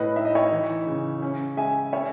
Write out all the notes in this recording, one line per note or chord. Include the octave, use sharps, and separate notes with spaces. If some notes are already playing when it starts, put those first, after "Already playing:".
Already playing: A2 B4 D#5
D#4 E5
D#5
C#5 E5
E3
C#3
C#4
G#3 E5 G#5
C#4 C#5 E5